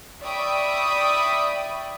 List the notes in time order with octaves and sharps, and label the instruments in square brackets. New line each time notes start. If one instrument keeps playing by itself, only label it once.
[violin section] D5 E5 G5 B5 C#6 D#6